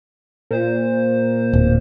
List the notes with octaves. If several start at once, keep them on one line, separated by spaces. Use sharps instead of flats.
A#2 C5
D1